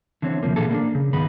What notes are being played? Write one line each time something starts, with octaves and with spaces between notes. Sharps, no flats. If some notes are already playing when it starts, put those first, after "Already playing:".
D3 E3 C4 C#5
D2 C3 F3 A#3
A#2 D3 E3 A#3 G#4 A4
A#3 C#4 D4
C#3
C#2 G#2 D#3 B3 B5